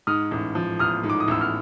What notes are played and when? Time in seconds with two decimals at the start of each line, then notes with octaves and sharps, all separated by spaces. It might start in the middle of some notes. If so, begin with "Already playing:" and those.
0.07 G#2 D#6 F6
0.31 A1
0.55 F3
0.79 A1 D#6 F6
1.03 G#2
1.10 D6
1.20 D#6
1.28 A1 E6
1.41 F6